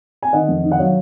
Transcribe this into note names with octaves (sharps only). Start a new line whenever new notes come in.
G#5
D#3 D#5 F#5
F1
D#3
F#5
F#3 C#5 F5